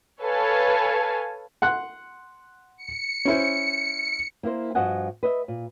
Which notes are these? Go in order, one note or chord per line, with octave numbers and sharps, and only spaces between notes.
A4 B4 C#5 F5 G#5 A5
F#5 C6 F#6
C#7
C#4 E4 C5
A#3 E4 A#4 C5
G2 F3 F#4 D#5 F#5 G#5
B4 D#5 E5
A#2